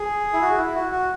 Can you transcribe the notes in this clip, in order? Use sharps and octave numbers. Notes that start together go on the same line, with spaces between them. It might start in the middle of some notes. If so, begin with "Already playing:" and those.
Already playing: G#4
E4
F#4
E4
F#4
F#4